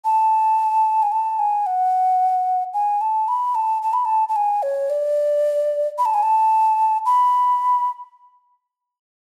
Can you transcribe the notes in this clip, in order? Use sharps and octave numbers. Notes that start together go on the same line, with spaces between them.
A5
G#5
A5
G#5
F#5
G#5
A5
B5
A5
A5
B5
A5
A5
G#5
C#5
D5
B5
A5
G#5
A5
B5